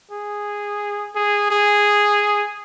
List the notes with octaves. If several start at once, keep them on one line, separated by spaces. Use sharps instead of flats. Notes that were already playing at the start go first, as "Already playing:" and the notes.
G#4
G#4
G#4